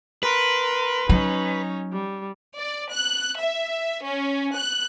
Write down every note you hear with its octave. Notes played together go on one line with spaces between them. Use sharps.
A#4 B4 C6
F#3 C#4 D#4
G3
D5
F#6
E5
C#4
F#6